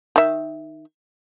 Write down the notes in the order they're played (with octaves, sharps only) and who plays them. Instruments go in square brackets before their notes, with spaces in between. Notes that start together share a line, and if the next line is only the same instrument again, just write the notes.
[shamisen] D#3 E5